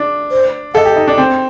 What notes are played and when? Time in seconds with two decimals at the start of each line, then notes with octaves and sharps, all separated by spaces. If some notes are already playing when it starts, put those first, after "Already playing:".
Already playing: D4
0.31 C5
0.74 A4 D#5 F#5
0.85 G4
0.96 D#4
1.08 D4
1.18 C4